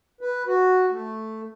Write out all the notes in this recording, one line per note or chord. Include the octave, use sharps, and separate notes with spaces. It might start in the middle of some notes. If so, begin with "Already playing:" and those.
B4
F#4
A3